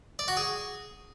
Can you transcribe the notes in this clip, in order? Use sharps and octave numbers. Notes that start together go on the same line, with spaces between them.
D5
F#4
G#4